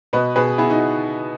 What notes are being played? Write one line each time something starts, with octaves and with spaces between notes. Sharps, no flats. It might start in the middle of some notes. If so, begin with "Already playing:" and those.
B2 B4 D#5
B2 G#4 B4
B3 E4 G#4
D#4 F#4